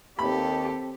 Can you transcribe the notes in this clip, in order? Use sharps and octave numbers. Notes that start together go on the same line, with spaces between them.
D#2 C4 G4 A4 B5